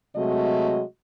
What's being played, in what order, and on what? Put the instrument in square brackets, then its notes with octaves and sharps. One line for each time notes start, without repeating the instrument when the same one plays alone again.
[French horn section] C3 F#3 G#3 A3 F#4 D#5